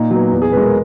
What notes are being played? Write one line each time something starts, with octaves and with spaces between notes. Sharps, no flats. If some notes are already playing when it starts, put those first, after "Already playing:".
Already playing: A#2 D#4
F#3 B3
E2
G#4
B2 G#3 B4
A#4